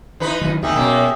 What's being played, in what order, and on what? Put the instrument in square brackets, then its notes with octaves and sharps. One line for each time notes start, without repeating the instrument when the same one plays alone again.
[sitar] E3 D#4 B4
[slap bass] D#3 F#3
[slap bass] D2 [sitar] D#3 D#4 [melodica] G4 G#4 E5
[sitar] F#2 A#3 [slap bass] B2